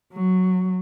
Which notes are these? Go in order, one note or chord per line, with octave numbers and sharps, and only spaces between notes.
F#3